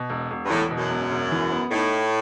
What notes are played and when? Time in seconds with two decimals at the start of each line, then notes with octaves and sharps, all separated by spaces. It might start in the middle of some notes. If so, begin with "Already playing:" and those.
Already playing: B2
0.10 E1
0.31 E1
0.45 G2
0.50 E2 A2
0.71 B2
0.77 F#2
0.91 E1
1.11 E1
1.31 E3
1.52 B3
1.71 A2 D#4